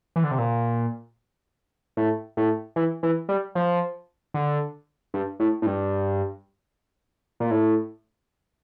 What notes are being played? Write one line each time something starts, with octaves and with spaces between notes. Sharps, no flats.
E3
D3
C3
A#2
A2
A2
E3
E3
G3
F3
D3
G2
A2
A2
G2
A#2
A2